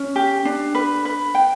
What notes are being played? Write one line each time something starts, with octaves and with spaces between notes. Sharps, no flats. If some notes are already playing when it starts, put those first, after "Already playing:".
Already playing: C#4
G4
D4
B4
B4
G5